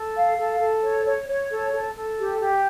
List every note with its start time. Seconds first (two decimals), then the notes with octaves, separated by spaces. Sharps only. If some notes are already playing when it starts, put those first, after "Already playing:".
Already playing: A4
0.15 F5
0.38 A4
0.60 A4
0.83 C#5
1.05 C#5
1.28 C#5
1.49 A4
1.72 A4
1.95 A4
2.18 G4
2.40 G4